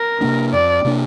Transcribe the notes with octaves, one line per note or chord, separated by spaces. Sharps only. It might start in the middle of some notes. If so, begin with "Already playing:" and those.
Already playing: A#4
C3 A#3 D4
F2 D5
C3 A#3 D4